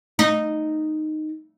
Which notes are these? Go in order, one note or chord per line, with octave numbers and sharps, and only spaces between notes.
D#4